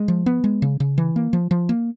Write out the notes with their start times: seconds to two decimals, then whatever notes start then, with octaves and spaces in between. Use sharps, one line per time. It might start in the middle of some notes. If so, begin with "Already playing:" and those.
Already playing: G#3
0.08 F3
0.26 B3
0.44 G#3
0.62 C#3
0.80 C#3
0.98 E3
1.16 A#3
1.33 F3
1.51 F3
1.69 A#3